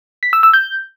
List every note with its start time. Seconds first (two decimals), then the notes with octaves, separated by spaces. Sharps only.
0.23 B6
0.33 E6
0.43 E6
0.53 G6